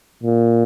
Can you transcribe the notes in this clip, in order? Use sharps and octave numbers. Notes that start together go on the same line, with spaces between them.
A#2